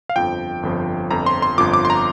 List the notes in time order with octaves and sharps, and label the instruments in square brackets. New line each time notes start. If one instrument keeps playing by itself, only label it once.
[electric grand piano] F5
G1 F2 F3 G5
G1 F2 F3
G1 F2 F3 A#5
C6
C6
G1 F2 F3 D6
D6
C6
A#5